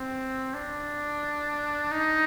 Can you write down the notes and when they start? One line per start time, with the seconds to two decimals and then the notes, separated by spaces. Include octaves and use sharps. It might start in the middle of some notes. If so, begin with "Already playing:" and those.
Already playing: C4
0.54 D4
1.92 D#4